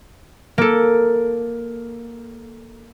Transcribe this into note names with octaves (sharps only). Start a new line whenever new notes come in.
A#3 A4